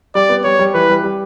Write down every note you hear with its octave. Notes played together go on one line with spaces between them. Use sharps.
G3 D5
B3
G3 C#5
G3
E3 B4
G3
G3